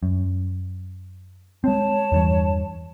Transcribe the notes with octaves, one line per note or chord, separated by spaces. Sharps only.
F#2
G#3 C4 C#5 A5
E2 G2 E3